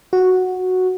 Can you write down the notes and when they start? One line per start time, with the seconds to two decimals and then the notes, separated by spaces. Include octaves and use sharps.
0.13 F#4